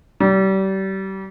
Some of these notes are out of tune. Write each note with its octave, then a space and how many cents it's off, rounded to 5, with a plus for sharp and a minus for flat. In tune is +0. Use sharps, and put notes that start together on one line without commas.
G3 -30